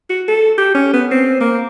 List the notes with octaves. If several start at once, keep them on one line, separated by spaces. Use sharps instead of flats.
F#4
A4
G4
C#4
B3
C4
A#3